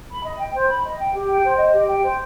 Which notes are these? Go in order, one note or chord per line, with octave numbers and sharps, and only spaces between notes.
B5
D#5
G5
C5
B5
D#5
G5
G4
G5
C5
D#5
G4
G5
C5